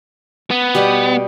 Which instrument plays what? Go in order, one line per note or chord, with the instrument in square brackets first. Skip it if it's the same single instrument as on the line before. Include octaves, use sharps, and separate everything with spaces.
[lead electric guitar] B3
[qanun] B2 G3 G4